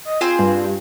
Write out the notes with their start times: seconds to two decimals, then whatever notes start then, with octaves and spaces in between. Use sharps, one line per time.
0.05 D#5
0.21 C4 F4 G#4 C5
0.39 G2